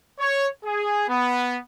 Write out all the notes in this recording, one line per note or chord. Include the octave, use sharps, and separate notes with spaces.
C#5
G#4
B3